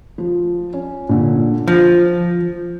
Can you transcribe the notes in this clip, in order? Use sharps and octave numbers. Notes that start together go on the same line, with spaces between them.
F3
C#4
A#2 D3
F3 A#6